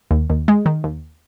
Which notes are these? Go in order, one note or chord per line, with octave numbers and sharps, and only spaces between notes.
D#2
D#2
G#3
D#3
D#2